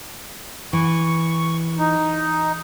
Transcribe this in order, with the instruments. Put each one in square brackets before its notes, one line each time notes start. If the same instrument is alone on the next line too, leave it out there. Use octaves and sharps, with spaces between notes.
[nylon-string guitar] E3 [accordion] C#6
[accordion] D#4